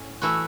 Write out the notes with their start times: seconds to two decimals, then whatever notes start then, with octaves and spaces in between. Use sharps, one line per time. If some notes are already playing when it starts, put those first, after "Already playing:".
Already playing: A2 C#4
0.21 E3 A3 E4 F#4